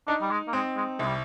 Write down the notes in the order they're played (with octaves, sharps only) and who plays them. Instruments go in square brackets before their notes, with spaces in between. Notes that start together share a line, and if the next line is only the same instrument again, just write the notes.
[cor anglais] D4 [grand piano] D#4
[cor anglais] G3
G#3
A#3
[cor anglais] G#3 [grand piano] C4
[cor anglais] G#3
[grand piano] C2 [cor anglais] G#3
[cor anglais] G3